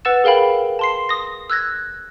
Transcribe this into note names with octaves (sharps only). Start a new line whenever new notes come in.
B4 F#5 E6 A6 E7
G#4 A#4 F5 G5 B5
A5 C6 C7
D#6 A#6
E6 F#6 G#6 A#6